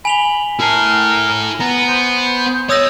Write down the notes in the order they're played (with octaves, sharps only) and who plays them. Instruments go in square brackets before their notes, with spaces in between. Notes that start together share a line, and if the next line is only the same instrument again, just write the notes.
[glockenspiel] G#5 F7 G7 [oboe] B5
[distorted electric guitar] E4 A5 [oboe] A#4
[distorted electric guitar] B3 [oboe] A#5
[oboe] C5
[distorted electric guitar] C#5 D#5 [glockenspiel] D#6 E6 A#6